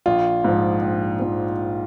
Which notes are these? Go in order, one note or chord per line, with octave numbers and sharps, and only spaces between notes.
A#1 F4
G#2 F3
A#1
G#2 F3